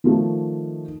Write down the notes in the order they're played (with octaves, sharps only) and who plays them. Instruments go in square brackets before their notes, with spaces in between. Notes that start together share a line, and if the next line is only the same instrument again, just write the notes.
[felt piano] D#3 F3 A3